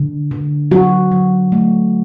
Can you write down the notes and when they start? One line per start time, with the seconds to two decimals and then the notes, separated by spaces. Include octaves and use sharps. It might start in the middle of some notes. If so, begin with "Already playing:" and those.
Already playing: D3
0.31 D3
0.71 F#3 F#4
1.12 F#3
1.52 A3